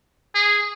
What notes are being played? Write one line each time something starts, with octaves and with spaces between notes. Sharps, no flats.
G#4